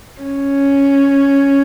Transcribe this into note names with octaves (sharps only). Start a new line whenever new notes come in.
C#4